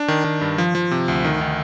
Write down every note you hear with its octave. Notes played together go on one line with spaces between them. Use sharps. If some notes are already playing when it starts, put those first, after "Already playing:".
Already playing: D4
D#3
D#3
G2
F3
F3
C3
D2
D#3
D#3